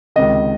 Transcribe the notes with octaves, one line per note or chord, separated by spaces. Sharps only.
C#2 C3 D#3 D#5